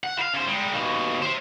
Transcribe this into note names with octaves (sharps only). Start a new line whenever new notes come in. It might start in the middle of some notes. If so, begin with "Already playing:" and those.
F#5
E4 F5
C#3 C5
G3 G#3
D#2 B2
C5 E5